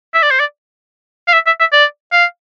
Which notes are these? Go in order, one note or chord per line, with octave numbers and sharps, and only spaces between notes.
E5
D5
C5
D5
F5
E5
E5
E5
D5
F5